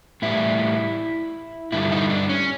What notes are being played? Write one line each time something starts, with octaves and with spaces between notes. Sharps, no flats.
A2 E3 G3 E4
G2 D3 G3 E4
D#4
D4
C#4